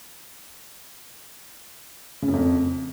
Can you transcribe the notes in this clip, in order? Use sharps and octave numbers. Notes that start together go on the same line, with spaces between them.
C#3
F#2
F2